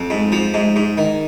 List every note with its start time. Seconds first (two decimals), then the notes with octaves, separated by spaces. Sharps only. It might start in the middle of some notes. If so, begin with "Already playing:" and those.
Already playing: F2
0.10 G#2
0.32 F3
0.54 G#2
0.76 G#2
0.98 D#3